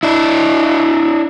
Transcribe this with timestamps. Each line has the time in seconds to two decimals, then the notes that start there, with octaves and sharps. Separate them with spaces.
0.03 D4 E4